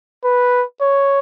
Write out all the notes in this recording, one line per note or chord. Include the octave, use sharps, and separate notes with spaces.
B4
C#5